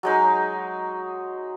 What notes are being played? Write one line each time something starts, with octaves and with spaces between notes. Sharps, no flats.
F#3 G#3 D#4